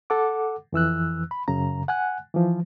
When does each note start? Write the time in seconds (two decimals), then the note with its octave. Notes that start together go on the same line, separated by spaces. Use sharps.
0.10 A4 F#5 D6
0.73 F2 E3 E6 F#6
1.31 B5
1.48 F#2 C#3 A#5
1.88 F#5 G#5 F#6
2.34 E3 F3